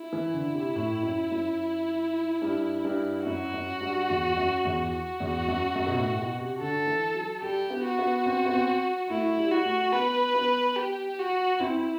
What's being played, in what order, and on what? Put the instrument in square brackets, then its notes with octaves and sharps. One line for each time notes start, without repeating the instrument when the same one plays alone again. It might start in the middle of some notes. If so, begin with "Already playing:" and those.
Already playing: [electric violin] E4
[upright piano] E3
D3
C3
A2
F#2
F#2
G2
G2
[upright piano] F#2 [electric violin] F#4
[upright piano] F#2
G2
E2
F#2
E2
[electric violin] F#4
[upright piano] E2
F#2
F#2
B2
A2
B2
C3
[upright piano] D3 [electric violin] A4
[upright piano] E3
F#3
[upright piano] G3 [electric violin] G4
[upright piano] B3
[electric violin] F#4
[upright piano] B3
C4
B3
C4
[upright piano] A3 [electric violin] E4
[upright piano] G3
[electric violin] F#4
[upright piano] A3
[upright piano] B3 [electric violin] B4
[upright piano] B3
[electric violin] G4
F#4
[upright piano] C4 [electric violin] E4